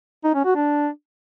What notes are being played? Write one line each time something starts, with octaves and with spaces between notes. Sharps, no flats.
D#4
C#4
F#4
D4